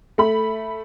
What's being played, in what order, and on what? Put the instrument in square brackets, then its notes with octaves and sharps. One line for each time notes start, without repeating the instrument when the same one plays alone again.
[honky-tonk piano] A3 B5